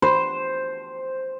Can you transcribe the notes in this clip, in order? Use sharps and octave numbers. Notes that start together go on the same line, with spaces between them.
C5